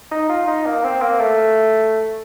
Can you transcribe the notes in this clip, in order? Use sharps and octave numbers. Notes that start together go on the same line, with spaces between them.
D#4
F4
D#4
A#3
C4
A#3
A3